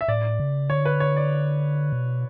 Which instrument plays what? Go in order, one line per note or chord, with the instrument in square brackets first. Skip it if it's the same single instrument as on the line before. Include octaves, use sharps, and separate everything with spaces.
[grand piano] E5
[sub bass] A2 [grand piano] D5
[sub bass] C#3
[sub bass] D3 [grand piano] C#5
[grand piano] B4
C#5
D5
[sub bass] B2